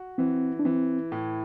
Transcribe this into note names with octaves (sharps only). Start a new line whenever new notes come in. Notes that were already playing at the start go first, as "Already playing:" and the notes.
Already playing: F#4
E3 C4
D4
E3 C4
A2